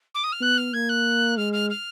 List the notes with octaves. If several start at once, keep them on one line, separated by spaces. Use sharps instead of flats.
D6
D#6
F6
B3 F#6
F6
A#3 G#6
F#6
G#3 F6
F6
F6